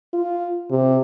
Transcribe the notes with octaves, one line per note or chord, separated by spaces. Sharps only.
F4
C3